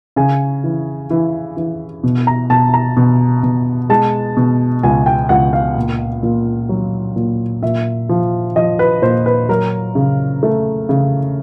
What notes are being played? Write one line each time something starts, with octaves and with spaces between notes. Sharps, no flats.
C#3 G#5
E3
E3
E3
B2
A#5
B2 A5
A#5
B2
B2
G#3 A5
B2
C#2 G#5
G5
C#2 F#5
F5
A#2
A#2
F#3
A#2
A#2 E5
F3
F3 D#5
B4
A#2 C5
B4
F#3 A#4
C#3
A3
C#3